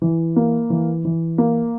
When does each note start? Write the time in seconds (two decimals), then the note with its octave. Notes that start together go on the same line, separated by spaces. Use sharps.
0.02 E3
0.36 A#3
0.70 E3
1.05 E3
1.38 A#3